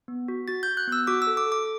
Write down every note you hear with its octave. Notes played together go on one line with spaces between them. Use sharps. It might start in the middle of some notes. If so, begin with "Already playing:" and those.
B3
F#4
F#4 A6
F#4 G6
F#6
B3 E6
F#4 D6
E6
A4
D6
A4
D6